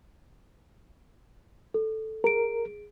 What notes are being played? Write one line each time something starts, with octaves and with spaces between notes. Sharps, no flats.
A4
G#4 A#4 D7